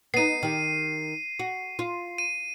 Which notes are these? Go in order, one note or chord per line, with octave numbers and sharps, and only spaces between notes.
B3 D#4 C7 D#7
D#3 G4
F#4
F4
D#7